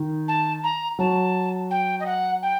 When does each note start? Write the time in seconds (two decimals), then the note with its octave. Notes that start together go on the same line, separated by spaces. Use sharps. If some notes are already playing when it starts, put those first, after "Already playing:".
Already playing: D#3
0.28 A5
0.63 A#5
0.99 F#3 A5
1.71 G5
2.00 D#5
2.06 F#5
2.42 G5